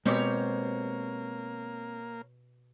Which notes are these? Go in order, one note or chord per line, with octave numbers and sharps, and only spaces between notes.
B2 G#3 A#3 C4 G4 C5 C#5